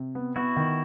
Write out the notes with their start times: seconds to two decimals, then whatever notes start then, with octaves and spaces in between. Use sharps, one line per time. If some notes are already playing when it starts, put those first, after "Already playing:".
Already playing: C3
0.15 B3
0.36 B3 E4 F#4
0.56 D#3